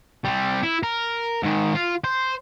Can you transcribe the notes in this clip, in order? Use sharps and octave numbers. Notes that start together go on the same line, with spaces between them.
G3 C4
E4
A#4
G#2 D#3
F4
C5